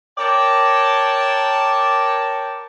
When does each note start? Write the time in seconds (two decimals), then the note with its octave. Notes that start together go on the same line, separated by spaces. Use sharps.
0.18 A#4 C#5 D5 G5 A5